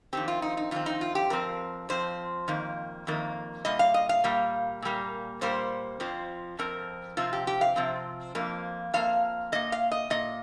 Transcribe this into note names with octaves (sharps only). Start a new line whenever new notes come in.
F2 D#3 C4 G4
F4
D#4
D#4
F2 D#3 C4 F4
D#4
F4
G4
F2 F3 C4 A#4
F2 F3 C4 C5
F2 D#3 A#3
F2 D#3 A#3
A#2 G3 D#5
F5
D#5
F5
A#2 G3 A#3
A#2 G3 A#3
A#2 G3 A#3 C5
F2 F3 C4
F2 F3 C4 A#4
C3 F3 C4 F4
G4
G4
F5
C3 F3 C4
F2 F3 A#3
F2 F3 A#3 F5
A#2 A#3 D#5
F5
D#5
A#2 A#3 D#5